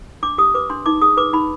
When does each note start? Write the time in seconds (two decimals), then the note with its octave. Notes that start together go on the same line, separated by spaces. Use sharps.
0.23 D4 D6
0.38 G4 D#6
0.55 B4 D6
0.70 D4 C6
0.86 D#4 D6
1.02 G#4 D#6
1.17 B4 D6
1.33 D#4 B5